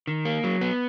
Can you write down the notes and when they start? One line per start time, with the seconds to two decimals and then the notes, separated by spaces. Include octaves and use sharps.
0.07 D#3
0.25 A#3
0.44 F#3
0.61 B3